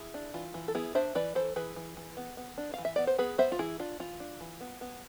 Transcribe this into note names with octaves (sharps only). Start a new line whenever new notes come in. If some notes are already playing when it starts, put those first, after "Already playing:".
Already playing: E4 G#4
D4
E3 F4
E3
A4
B3 E4 G#4
D4 C5 E5
E3 B4 D5
E3 A4 C5
E3 G#4 B4
E3
E3
B3
B3
D4
E3 F5
E5
B3 D5
C5
B3 G#4 B4
B3 C5 E5
F4
E3 E4 G#4
D4 F4
E3 F4
D4
E3
B3
B3